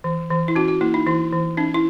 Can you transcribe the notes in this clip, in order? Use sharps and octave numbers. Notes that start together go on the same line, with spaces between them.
E3
E3
E4
C#4 F#4
F#4
A#3 E4
D#4
E3 E4
E3
C#4 D#4
E4